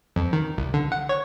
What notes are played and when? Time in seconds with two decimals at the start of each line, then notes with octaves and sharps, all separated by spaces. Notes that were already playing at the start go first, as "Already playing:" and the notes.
0.16 F2
0.33 D#3
0.57 C2
0.74 D3
0.92 F#5
1.09 C#5